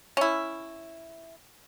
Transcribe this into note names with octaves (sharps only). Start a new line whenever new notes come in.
C#4 E4